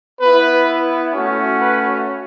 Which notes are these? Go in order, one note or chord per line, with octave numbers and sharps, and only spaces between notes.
B3 E4 B4
A3 C#4 F#4
B4